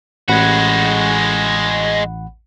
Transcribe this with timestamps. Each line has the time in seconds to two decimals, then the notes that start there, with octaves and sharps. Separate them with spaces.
0.29 A1 G#3 F#4 F#5 B5